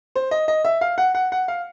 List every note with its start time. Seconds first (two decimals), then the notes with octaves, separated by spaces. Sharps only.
0.16 C5
0.31 D#5
0.48 D#5
0.65 E5
0.81 F5
0.98 F#5
1.15 F#5
1.32 F#5
1.48 F5